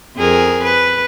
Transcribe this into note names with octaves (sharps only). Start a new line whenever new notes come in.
F2 G#4 A#4
B4